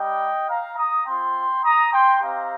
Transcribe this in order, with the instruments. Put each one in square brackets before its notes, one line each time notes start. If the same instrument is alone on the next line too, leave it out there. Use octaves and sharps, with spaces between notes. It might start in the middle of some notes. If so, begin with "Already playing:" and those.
Already playing: [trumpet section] G3 D#4 G4 D#5 G5
F5 A#5
A#5 D#6
C4 F4 G5 C6
A#5 D#6
G5 C6
C4 D#4 G4 F5 A#5